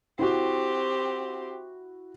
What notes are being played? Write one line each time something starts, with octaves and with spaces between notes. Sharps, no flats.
C4 E4 F#4 G4